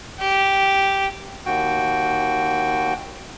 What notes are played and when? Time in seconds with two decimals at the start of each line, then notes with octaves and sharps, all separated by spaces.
0.20 G4
1.46 D#2 F#4 G5